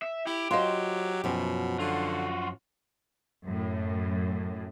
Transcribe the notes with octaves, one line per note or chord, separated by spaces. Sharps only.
E5
E4 G4
F#3 F4 C5 D#5 F5 C6
F#2 B2 F3
D3 F4 F#4
F#2 A2